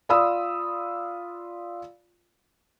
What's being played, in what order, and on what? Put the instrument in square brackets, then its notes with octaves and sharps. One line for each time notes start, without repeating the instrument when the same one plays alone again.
[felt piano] F4 D5 F5 B5 D#6 E6